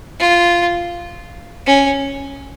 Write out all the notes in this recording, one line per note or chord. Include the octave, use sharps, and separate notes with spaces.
F4
C#4